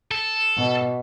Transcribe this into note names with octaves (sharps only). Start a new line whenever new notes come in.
A4
B2